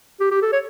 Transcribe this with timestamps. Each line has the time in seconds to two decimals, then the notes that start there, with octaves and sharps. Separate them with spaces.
0.20 G4
0.31 G4
0.42 A4
0.53 C#5